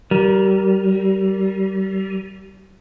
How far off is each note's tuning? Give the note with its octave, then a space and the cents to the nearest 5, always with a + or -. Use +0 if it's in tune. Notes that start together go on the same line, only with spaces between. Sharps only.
G3 -30 A#4 +5